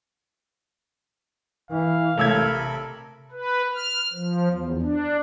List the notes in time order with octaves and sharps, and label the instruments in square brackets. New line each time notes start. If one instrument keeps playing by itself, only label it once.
[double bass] E3 [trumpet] F5
[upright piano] A1 E6 G#6 [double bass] C3 [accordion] A4 A#4 B5
[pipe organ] B4
F6
F3
E2
D4